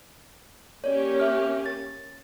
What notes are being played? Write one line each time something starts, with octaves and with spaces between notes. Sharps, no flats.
A#3 C#4 G4 C#5 D5
E5 F6
A6